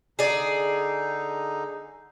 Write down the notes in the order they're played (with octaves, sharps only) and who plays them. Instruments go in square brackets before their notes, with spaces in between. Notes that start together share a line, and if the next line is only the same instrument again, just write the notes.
[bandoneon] D3 D#4 [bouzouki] G#4 D5